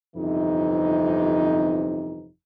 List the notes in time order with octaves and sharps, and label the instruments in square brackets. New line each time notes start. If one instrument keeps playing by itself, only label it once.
[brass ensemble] G1 F2 C3 E3 D#4